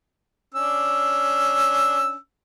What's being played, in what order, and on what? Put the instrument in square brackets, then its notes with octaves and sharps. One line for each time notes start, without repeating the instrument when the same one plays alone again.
[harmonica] C#4 D4 E6